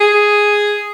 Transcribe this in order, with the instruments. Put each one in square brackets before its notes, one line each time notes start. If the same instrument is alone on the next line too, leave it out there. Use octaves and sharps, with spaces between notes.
[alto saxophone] G#4